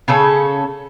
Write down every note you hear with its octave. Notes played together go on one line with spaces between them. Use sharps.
C#3 C#4 A4